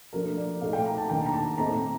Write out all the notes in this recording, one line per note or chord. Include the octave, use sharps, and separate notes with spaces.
F3 A3 D4 A#4
D5
A2 A3 D#4 F5
G5
A#5
A5
D#3 A#3 D4 G5
A#5
A5
A2 A3 C4 D#4 A#5